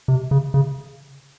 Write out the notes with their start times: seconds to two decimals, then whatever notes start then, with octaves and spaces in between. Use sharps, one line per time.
0.08 C3
0.31 C#3
0.54 C#3